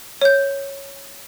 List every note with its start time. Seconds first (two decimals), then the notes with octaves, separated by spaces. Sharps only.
0.21 C#5 G6